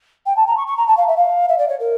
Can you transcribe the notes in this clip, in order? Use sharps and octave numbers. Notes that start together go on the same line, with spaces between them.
G5
A5
A#5
C#6
C#6
A#5
A5
F5
E5
F5
E5
D5
C#5
A#4